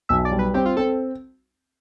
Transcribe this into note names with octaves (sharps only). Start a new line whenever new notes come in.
B1 E5
D5
G3
B4
C4 G4
F4
C4 A4